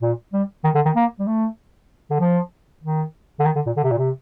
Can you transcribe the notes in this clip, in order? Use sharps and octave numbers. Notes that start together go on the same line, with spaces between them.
A#2
G3
D#3
D3
D#3
A#3
G3
A3
D3
F3
D#3
D3
D#3
D3
A#2
D3
C3
A#2
C3